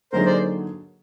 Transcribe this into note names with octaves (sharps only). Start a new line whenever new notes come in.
D3 F#3 A#3 D#4 G#4 A#4 C5
C5 D5